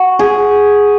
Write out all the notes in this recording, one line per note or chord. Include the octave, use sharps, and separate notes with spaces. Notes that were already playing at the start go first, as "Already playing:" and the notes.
Already playing: F#4
G#4